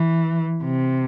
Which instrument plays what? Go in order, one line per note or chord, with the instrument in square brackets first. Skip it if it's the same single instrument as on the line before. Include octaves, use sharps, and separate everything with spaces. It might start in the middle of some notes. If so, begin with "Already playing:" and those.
Already playing: [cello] E3
C3